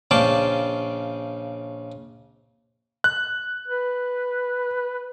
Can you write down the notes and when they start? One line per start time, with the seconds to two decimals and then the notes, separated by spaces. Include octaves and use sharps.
0.11 A#1 C#3 D5 F5 G5 A5
3.04 F#6
3.68 B4